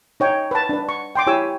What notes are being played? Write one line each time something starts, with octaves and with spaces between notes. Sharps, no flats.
D#4 C#5 G5
B4 A5
D4 B4
C#6
G5 C6 D6
E4 G4 C#5 G#5 E6